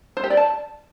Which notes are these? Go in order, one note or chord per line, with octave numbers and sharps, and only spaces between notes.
C5
G4
D5
A5